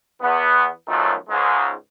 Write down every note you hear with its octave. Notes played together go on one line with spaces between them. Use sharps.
E2 B3
B1 F#2 D#3 F3 F#3 A3
C#2 G#2 G#3